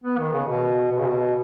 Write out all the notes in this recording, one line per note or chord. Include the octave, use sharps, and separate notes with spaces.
B3
D#3
C#3
B2
B2
C#3
B2